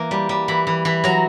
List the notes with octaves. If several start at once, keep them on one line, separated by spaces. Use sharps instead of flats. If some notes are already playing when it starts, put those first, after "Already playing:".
Already playing: E3 A#3
G3
G3
E3 B5
E3
E3 B5
F#3 A#5